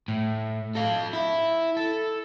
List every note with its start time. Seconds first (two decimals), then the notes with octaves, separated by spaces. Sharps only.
0.08 A2
0.75 A4 F5
1.13 E4
1.77 A4